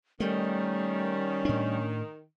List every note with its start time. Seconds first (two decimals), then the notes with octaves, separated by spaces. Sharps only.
0.20 D#3 G3 A3 C#4
1.45 A2 D4